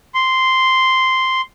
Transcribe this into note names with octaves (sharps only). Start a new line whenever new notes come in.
C6